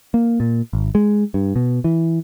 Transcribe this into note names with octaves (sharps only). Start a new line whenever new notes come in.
A#3
A#2
G#1
G#3
G2
B2
E3